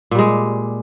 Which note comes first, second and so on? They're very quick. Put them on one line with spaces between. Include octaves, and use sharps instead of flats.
A#2 G3 G#3